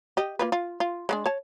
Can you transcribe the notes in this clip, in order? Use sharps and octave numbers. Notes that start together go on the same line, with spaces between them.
G4 D#5
A#3 F4 B4
F4
F4
G#3 B3 D4
C#5 A5